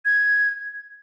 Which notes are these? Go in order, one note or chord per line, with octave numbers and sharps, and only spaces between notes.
G#6